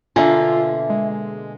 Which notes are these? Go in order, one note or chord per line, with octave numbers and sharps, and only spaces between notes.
B2 D3 A#3 F4 E5 G#5
G#3